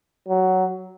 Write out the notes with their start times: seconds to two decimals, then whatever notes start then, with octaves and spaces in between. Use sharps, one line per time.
0.28 F#3